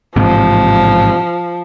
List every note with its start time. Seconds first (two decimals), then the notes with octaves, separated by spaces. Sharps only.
0.16 A1 G#2 C3 F3